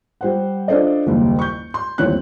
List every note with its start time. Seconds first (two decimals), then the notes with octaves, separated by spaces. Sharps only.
0.21 G3 C5 F#5
0.68 D4 F4 A4 C5 D5 D#5
1.07 F#1 D#2 G3
1.39 C#6 G6
1.74 C6
1.98 G1 D#2 E3 C4 C#5 F#6